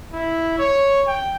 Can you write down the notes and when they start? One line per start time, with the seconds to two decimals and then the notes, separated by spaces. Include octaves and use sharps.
0.13 E4
0.59 C#5
1.08 G5